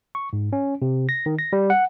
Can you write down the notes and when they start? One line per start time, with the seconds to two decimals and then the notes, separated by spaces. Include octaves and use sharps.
0.15 C#6
0.33 G#2
0.53 C#4
0.82 C3
1.09 A#6
1.26 D#3
1.39 A#6
1.53 G3
1.70 F#5